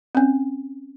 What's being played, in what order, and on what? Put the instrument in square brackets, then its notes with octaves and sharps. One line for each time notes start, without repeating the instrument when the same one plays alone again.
[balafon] C4 C#4